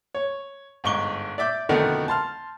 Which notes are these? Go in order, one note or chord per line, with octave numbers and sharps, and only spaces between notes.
C#5
G1 G#2 C#6 D6 G7
D5 E5 D6 G6
F2 B2 D3 D#3 A3 B3
A5 C6 F6